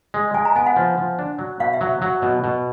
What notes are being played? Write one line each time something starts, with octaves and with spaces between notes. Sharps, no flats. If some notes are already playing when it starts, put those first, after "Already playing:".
G#3
G#3 G#5
A#5
B3 G#5
F#5
F3
F3
D4
F#3
B2 F5
E5
F#3
F#3
B2
B2